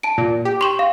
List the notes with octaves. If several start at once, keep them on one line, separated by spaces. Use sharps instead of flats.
A5 D7
A#2
G4
C6 C#6 E7
F5